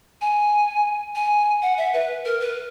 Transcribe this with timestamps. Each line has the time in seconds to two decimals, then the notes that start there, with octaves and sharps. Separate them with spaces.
0.21 G#5
1.15 G#5
1.62 F#5
1.78 E5
1.94 B4
2.25 A#4
2.40 B4